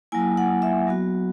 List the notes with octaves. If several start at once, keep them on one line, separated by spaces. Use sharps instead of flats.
F#3 A#3 E4 G#5
F#5
E5
F#3 B3 F#4